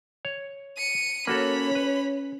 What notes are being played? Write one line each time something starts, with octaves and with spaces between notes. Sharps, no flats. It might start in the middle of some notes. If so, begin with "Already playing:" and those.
C#5
C#7 D#7
A#3 C#4 F#4 A4 C#5 B5
B4